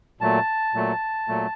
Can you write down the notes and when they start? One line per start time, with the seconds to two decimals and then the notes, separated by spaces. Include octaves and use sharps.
0.21 A#2 F#3 A3 A5
0.74 A#2 F#3 A3
1.28 A#2 F#3 A3